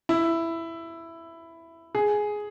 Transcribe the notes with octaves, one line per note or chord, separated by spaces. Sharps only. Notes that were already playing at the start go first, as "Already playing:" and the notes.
E4
G#4